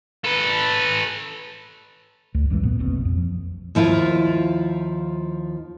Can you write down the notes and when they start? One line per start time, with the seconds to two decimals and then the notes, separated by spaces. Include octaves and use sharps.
0.25 A4 B4
2.34 D2
2.50 A#1 F#2 E3 G#3
2.63 A#2 A#3 B3
2.79 F1 A#1 B2 C4
3.05 F2
3.17 F3
3.75 D#2 F3 E4 F4